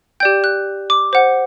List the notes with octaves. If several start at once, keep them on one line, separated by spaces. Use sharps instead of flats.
G4 D5 G5 G6
F#6
D6
C5 F#5